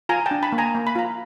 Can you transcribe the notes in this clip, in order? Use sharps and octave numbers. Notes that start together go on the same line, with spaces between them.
F4 G#5 A#5
G5 A5
D4
A5 B5
A#3
G#5 A#5
A#3
B5
F4 A#5